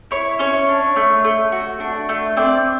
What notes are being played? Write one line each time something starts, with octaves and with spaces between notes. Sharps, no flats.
E4 C#5
C#4 C#5
D4
A3
A3
F#4
D4
A3
C4 D5